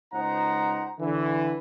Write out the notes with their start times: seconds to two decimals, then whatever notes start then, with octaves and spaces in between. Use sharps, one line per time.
0.12 C#2 D#4 C5 F#5 A#5
0.99 D3 E3